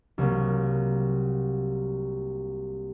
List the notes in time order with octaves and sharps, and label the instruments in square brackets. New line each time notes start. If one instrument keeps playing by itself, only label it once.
[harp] C2 F#3 A#3